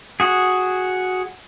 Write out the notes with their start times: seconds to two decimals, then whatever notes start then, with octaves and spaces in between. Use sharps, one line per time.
0.20 F#4 G#4